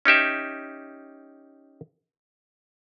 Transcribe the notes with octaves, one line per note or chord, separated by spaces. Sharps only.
C#4 D#4 G4 E5